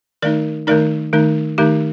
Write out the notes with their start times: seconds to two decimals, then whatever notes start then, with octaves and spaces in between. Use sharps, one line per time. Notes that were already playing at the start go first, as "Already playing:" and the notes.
0.22 D#3 A3 D#4 A#4 D5
0.67 D#3 A3 D#4 A#4 D5
1.13 D#3 A3 D#4
1.58 D#3 A3 D#4 G4